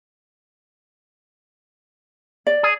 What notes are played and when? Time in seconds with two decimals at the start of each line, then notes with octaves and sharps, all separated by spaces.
2.47 D5
2.63 G#4